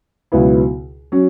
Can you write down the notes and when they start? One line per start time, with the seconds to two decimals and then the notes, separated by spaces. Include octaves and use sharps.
0.32 C#2 B2 F#3 B3 E4
1.12 F#3 C#4